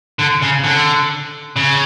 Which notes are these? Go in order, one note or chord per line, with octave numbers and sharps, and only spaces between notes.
D3
C#3
D3
C#3